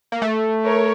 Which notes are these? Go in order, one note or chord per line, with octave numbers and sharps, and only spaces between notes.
A#3
A3
A#4 C#5